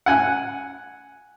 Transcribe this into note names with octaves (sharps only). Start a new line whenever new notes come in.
F#5 G#5 F#6